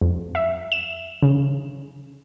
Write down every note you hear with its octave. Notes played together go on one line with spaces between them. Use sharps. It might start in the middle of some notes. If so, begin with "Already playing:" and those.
F2
E5
E7
C#3